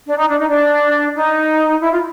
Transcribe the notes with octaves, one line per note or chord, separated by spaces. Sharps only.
D4
D#4
D4
D#4
D4
D#4
E4
F4